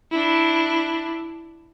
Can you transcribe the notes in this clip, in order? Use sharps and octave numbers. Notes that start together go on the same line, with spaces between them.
D4 E4